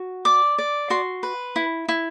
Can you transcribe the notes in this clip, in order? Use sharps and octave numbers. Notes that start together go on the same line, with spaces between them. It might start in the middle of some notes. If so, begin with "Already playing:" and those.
Already playing: F#4
D5 D6
D5
F#4 C6
B4
E4
E4